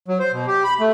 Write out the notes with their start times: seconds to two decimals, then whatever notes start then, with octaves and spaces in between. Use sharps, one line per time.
0.08 F#3
0.19 C5
0.32 B2
0.47 G4
0.64 B5
0.80 A3